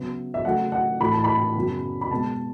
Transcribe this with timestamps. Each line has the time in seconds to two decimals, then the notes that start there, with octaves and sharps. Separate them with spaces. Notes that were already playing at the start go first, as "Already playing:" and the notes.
Already playing: C#3 F#3 B3 E5
0.34 E5
0.45 C#3 F#3 A3 F#5
0.72 F#5
1.00 A2 E3 A3 B5
1.12 A5
1.24 B5
1.55 F#2 C#3 F#3 B3
2.01 B5
2.11 B2 G#3 B3 A5